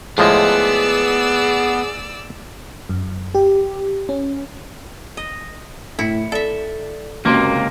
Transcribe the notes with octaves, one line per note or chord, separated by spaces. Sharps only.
A2 F3 G#3 B3 G#4 D5 E6
F#2
G4
C#4
D#5
A2 E4 C#7
A4 D5 E5
F#1 C#2 C3 A#3 F#4 C6